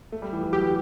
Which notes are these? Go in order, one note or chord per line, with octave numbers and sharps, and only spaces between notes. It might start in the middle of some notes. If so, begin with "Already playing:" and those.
A3
G3
E3
E3
F#3 G4